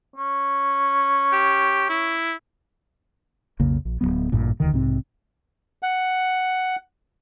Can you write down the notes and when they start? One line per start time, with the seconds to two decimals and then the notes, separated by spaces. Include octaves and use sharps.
0.16 C#4
1.32 G4
1.89 E4
3.60 B1 F2 C#3 A#3
3.85 A#1
4.01 D1 F2 F#3 B3
4.32 A1 G2 A#2
4.60 E1 D2 D3 D#3
4.73 B1 G#2 C3 C4
5.83 F#5